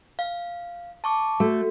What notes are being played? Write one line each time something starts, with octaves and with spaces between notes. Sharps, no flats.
F5
A5 C#6 D6
A3 F#4